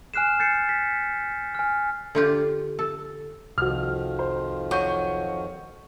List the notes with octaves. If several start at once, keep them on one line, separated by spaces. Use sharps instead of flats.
G#5 F6 F#6 C7 E7
G6 A6 C7 C#7
B6
G#5 F6
D3 F4 G4
A4
C2 F2 D#3 F3 F#4 F6
C5
F#3 C#6 G6 D#7